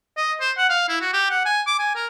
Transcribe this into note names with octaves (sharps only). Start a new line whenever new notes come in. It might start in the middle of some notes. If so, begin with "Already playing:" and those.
D#5
C5
F#5
F5
E4
F#4
G4
F#5
G#5
D6
G#5
A#4